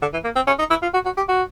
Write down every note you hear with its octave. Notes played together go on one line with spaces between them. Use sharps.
D3
E3
A#3
C4
C#4
D#4
E4
F4
F#4
F#4
G4
F#4